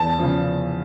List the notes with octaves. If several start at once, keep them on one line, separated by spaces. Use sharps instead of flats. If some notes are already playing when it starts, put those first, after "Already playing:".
Already playing: E2 A5
C#3 F3